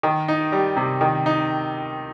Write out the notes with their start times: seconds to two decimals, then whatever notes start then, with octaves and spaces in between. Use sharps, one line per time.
0.03 D#3
0.28 D#4
0.52 G3
0.77 C3
1.01 D#3
1.26 D#4